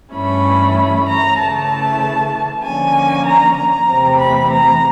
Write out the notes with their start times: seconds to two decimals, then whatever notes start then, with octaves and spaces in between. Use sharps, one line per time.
0.14 G2 E3 A3 C#4 E4 B5
1.08 A#5
1.38 C#3 E3 A3 A5
2.63 D3 F3 A#3 C#4 G#5
3.26 A#5
3.56 A#5
3.88 E2 C3 E3 A3 C4
4.18 B5
4.51 A#5